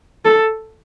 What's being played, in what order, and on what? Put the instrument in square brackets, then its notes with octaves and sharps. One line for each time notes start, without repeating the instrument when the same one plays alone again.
[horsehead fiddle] A4